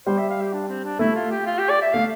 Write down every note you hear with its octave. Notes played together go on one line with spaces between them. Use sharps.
G3 C5
E5
F5
G4
D4
C4
D4
A3 E4
F4
G4
F4
G4
D5
E5
A3 F5